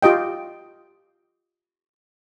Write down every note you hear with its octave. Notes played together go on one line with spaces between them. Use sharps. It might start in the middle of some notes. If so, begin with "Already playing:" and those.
F4 G4 D#5 G5